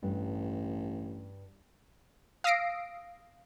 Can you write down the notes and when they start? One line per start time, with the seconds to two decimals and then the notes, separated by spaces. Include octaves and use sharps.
0.03 A1 G2
2.44 F5 D#6 E6 A#6 C7 D7